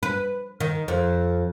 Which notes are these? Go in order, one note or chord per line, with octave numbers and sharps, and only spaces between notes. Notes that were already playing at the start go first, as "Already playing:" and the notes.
B4
D#3
F2